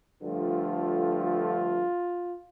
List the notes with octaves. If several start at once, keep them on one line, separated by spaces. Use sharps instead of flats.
G2 D3 F3 A3 F4
F4